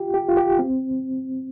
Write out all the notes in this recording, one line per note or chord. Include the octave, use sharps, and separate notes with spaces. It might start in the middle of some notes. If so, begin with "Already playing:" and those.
Already playing: F4 G4
G4
F4
G4
C4